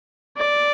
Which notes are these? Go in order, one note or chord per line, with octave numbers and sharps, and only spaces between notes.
D5